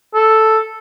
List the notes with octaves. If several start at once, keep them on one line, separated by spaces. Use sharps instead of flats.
A4